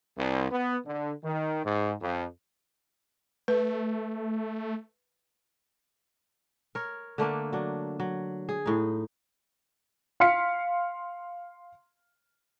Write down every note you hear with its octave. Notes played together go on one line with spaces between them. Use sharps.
C2
B3
D3
D#3
G#2
F2
A3 B4
A#4 C#5
D3 A3 A#3 D4
F#3 D4
F#3
G#4
A2 D#4
F5 C6 F6 B6 C#7